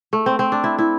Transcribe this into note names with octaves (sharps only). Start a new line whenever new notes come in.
A3
C4
C4
D4
E4
E4